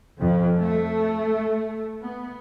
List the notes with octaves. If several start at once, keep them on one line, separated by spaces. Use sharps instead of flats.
F2
A3
B3